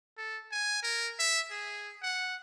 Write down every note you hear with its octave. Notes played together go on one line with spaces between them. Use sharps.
A4
G#5
A#4
E5
G#4
F#5